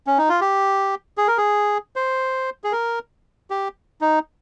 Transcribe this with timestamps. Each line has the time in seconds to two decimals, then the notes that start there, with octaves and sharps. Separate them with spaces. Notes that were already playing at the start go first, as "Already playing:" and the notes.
0.07 C#4
0.18 D#4
0.29 F4
0.41 G4
1.18 G#4
1.28 A#4
1.37 G#4
1.96 C5
2.64 G#4
2.72 A#4
3.50 G4
4.01 D#4